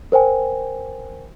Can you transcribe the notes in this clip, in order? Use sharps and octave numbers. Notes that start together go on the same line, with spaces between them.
A#4 C5 G5 G#5